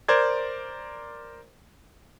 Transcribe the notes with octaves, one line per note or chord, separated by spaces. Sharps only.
A#4 C5 D5 G#6